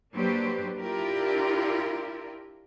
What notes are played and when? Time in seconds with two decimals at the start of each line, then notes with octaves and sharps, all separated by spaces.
0.15 F#3 A#3 D4 G4 B4 C5
0.80 D4 E4 F4 G4 A#4